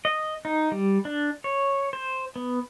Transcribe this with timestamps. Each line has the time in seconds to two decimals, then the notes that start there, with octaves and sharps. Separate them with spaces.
0.05 D#5
0.45 D#4
0.72 G3
1.05 D4
1.44 C#5
1.93 C5
2.36 B3